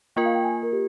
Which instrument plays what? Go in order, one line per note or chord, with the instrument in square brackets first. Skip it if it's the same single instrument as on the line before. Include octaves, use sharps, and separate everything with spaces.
[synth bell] A#3 F4 A#4 [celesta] G5
[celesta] F5
G5
G#5
A#4
G4